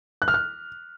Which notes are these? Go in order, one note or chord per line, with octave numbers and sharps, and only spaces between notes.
F#6
F6
F#6